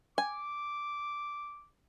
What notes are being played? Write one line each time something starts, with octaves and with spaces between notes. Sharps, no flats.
G#5 D6